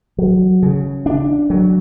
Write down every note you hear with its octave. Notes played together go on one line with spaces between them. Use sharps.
F#3
C#3
D4
F#3